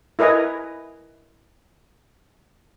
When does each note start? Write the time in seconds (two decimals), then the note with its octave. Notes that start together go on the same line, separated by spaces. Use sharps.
0.19 E4 A#4 B4 D#5 G#5